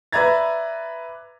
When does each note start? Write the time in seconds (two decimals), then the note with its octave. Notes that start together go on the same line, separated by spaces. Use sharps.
0.13 B4 D5 E5 A#5 G#6 A6